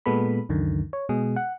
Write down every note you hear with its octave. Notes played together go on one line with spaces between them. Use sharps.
A#2 G#3 B3 A4 B5
C#2 F#2 D3 D#3
C#5
B2 G#3 G#4
F#5